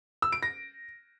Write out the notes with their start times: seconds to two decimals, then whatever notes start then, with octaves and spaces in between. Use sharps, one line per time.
0.22 E6
0.32 D7
0.43 A#6